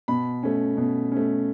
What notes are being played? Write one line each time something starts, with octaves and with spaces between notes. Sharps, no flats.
B2 B5
A3 C#4
B2
A3 C#4